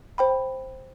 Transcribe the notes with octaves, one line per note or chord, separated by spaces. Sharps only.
C5 G5 B5